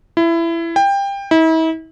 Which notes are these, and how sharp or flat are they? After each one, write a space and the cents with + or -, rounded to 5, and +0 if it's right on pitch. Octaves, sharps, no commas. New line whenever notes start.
E4 +20
G5 +20
E4 -40